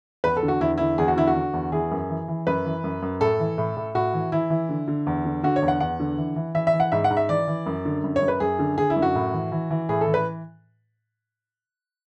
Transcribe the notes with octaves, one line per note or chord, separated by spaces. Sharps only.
E2 B4
A4
D3
F#4
E2 E4
D3 E4
E2 G#4
F#4
D3 E4
F#4
D3
E2
E3 G#4
F#2
E3
E3
F#2 B4
E3
F#2
F#2
A2 A4
E3
A2
A2
A2 F#4
E3
E3 E4
E3
D3
D3
E2
D3
D3 F#4
C#5
E2
F#5
E2 F#5
D3
E3
E3
E3 E5
E5
E3
F#5
G#2 E5
F#5
G#2
E5
E3 D5
E3
F#2
D3
F#2
C#5
F#2
B4
F#2 G#4
D3
D3 G#4
E4
F#2
F#4
A2
E3
E3
E3
A2 G#4
A4
E3
B4